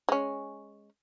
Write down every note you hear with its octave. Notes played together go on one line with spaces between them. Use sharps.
G#3 C#4